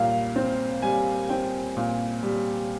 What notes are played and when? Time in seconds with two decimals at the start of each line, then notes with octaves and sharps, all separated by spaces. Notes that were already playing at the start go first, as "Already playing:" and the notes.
Already playing: A#2 G3 F5
0.36 C4
0.82 G3 G#5
1.29 C4 G5
1.77 A#2
2.23 G3